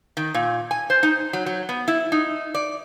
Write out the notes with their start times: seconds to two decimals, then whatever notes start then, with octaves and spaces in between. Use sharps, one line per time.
0.17 D#3
0.34 A#2
0.71 G#5
0.90 C5
1.03 D#4
1.33 F#3
1.46 F#3
1.69 B3
1.88 E4
2.12 D#4
2.55 D5